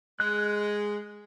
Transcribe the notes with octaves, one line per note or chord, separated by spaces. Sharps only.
G#3 F#6